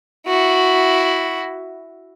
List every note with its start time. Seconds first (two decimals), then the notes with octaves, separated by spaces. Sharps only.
0.28 E4 F#4